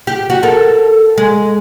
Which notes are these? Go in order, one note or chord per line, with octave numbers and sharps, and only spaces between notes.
G4
F#4
A4 A#4
G#3